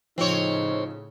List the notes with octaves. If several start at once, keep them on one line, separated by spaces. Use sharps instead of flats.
A2 C#3 F3 C4 D#4 C#5